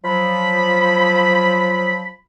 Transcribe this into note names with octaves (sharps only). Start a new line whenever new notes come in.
F3 F#3 B5